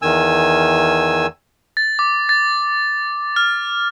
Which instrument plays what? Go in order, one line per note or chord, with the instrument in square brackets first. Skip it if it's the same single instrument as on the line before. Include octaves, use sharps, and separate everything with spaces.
[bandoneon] E2 D#3 G#5 E6
[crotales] A6
D6
A6
F6